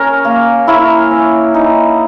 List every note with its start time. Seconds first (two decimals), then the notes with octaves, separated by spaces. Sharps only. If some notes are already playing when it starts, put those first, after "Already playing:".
Already playing: C#4 A#4 C#5
0.25 A#3
0.67 E4 A#4 C#5
1.11 C#4
1.54 D#4